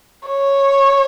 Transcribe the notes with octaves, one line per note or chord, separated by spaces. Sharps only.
C#5